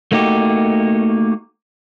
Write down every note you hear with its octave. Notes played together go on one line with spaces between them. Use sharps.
A3 A#3 D#4 F#4 G4